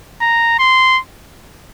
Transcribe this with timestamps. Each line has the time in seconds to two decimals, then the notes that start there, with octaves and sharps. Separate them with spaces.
0.21 A#5
0.59 C6